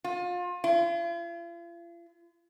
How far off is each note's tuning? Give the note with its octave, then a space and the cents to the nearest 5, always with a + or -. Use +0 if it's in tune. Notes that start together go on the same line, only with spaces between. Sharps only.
F4 +30
F4 -45